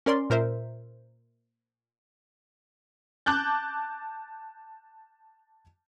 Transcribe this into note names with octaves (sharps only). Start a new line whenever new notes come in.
C#4 A#4 D5 C6
A#2 A#4 C5 E5
A5 D6 F#6 G6 A6